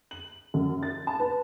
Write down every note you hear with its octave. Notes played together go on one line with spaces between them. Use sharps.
F#7
F#2
A6
A5
B4